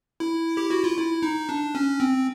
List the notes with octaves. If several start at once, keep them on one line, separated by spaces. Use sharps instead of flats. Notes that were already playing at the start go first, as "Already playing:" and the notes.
E4
G4
F#4
F4
E4
D#4
D4
C#4
C4